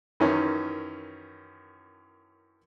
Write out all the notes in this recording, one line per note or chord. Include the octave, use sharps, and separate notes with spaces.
F#2 D#3 E3 C#4